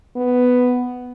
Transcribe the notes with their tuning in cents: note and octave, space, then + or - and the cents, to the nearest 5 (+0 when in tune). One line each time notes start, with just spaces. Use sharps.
B3 +5